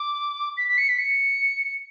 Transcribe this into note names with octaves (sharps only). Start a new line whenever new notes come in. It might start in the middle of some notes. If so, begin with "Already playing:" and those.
Already playing: D6
B6
B6
C#7
B6
C#7